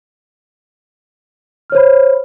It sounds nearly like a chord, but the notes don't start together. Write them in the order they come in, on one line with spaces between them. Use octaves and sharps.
F6 C#5 C5 B5